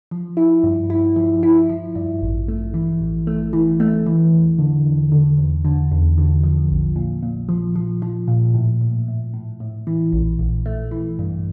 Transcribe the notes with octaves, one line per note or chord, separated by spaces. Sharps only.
F3
E4
G2
E4
F3
E4
F3
G2
A1
A3
E3
A1
A3
E3
A3
E3
E2
D3
E2
D3
E2
D3
E2
D3
F3
A#1
A#2
A#2
F3
F3
F3
A#2
A2
A2
A2
A2
A2
E3
A#1
A#1
A3
E3
G2